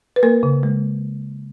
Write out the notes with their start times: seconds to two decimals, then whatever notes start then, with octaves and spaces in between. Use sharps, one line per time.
0.16 B4
0.23 A#3 A#4
0.43 C#3
0.63 G#3